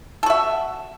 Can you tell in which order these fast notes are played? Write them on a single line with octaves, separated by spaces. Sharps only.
A4 F#4 E5